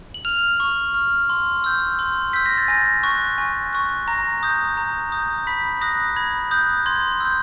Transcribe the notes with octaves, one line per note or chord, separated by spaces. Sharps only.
F#7
F6 F7
C#6
F6
C6
E6 G6
C6
E6 G6 B6
A#6
A6
G#5 A#6
C#6 F#6
G#5
C#6 F#6
A#5 A#6
D#6 G6
A#5
D#6 G6
B5 B6
D#6 F#6 A#6
B5 G#6
D#6 F#6 G6
C6 G#6
E6 G6